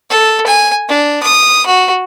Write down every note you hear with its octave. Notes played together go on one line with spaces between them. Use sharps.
A4
G#5
D4
D#6
F#4